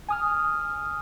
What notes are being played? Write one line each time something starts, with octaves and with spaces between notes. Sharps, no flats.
G#5 D#6 F6